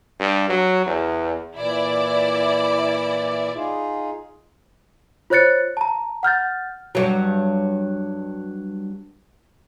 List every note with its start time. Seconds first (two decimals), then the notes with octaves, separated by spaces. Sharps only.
0.19 G2
0.50 F#3
0.86 E2
1.57 A#2 E3 E4 D5
3.55 D#4 F4 G#4
5.30 F4 C5 C#5 F#6 A6 C#7
5.77 A5 A#5
6.23 F#5 F6 G6 A6
6.95 G2 F#3